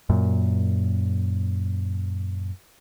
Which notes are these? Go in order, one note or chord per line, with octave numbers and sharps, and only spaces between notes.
F#2 A#2